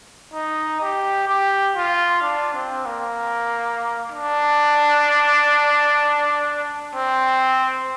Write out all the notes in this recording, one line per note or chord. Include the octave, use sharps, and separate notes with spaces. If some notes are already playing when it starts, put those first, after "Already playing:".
D#4
G4
G4
F4
D4
C4
A#3
D4
C4